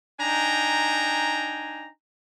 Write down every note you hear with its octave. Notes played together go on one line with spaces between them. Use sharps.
D4 D#4 G5 G#5 A#5